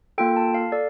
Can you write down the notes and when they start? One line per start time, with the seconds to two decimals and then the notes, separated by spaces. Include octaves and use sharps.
0.18 A#3 F4 A4 G5
0.36 A5
0.54 F5
0.72 A4 D5